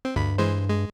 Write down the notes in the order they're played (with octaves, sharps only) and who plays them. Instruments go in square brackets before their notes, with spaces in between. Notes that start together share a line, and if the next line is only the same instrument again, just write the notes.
[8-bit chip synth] C4
[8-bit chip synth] D2 B5 [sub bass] G2
[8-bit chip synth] E3 G#3 C5
G#3